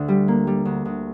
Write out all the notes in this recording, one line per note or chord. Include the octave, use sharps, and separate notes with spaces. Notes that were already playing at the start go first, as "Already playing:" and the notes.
Already playing: D2 D3
G3
A#3
G3
D2
D2